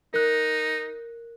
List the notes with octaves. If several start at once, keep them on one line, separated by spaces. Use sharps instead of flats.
D#4 A#4 F#6